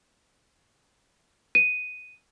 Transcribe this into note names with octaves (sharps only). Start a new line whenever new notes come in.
D#7